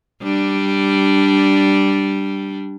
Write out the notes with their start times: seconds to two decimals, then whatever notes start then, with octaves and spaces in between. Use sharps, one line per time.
0.23 G3 D4